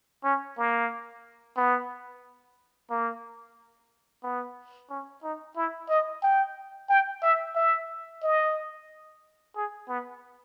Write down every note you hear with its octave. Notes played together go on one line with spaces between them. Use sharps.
C#4
A#3
B3
A#3
B3
C#4
D#4
E4
D#5
G5
G5
E5
E5
D#5
G#4
B3